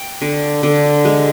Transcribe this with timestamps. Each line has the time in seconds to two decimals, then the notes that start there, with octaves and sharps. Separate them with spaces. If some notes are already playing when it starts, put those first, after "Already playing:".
Already playing: G5
0.22 D3
0.63 D3
1.05 G#3